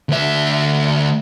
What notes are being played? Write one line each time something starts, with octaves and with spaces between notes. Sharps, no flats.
D2 E5